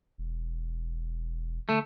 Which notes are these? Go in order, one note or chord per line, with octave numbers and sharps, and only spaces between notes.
E1
D3 A3